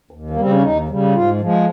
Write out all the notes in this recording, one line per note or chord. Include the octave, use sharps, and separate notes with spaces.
D#2
A#3
G3
C#3 C4
C#4
D#2 D#4
C#3 G3
G#2 F4
F3 G#3